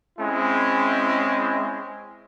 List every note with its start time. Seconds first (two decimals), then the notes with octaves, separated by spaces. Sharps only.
0.19 G#3 C4 C#4 E4